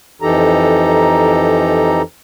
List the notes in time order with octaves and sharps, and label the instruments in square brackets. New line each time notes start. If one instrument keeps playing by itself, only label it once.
[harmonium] F2 E3 D#4 G4 A4 A#5